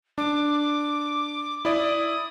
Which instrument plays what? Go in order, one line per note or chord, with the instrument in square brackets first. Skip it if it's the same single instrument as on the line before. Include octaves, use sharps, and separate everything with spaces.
[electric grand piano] D4 [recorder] D6
[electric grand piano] E4 D5 [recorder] D#6